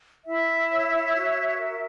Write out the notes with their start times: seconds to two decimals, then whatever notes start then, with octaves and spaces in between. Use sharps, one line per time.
0.24 E4 E5
0.69 C#5
1.14 F#4
1.57 A#4